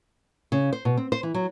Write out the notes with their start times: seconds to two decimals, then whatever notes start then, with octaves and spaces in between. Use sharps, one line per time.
0.52 C#3
0.73 C5
0.85 B2
0.97 C4
1.12 C5
1.23 E3
1.34 F#3